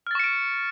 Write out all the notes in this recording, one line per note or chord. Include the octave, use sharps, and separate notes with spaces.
C#6 F6 A6 C#7 D7